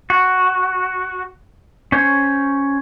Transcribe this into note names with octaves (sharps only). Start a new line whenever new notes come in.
F#4
C#4 C5 C#5